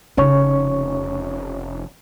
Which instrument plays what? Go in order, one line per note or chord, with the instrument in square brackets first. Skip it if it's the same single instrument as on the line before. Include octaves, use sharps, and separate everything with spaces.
[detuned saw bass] F1 [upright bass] C#3 D#4 [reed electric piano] C#4 C#5 C#6